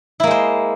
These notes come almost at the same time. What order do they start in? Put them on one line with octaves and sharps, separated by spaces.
E4 A#3 G#3 C5